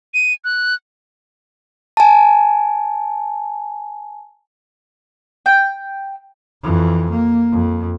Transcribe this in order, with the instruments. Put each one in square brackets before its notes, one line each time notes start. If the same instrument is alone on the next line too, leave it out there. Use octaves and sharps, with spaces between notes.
[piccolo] D#7
F#6
[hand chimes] G#5 A5
[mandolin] G5
[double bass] F2 E3
A#3
F2